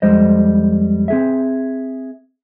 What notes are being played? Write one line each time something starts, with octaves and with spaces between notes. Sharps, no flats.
F2 G3 G#3 C5 D#5
C4 G#4 E5